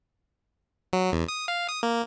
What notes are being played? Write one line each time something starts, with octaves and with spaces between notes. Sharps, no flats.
F#3
E2
D#6
F5
D#6
A#3